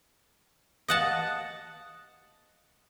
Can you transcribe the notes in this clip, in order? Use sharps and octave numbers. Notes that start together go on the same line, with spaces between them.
D#5 F#5 A5